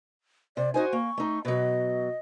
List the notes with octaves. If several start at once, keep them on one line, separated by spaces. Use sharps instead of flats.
C3 D5
D#4 F#4 C5 G#5
A#3 C#6
A3 D#4
B2 F#3 D#5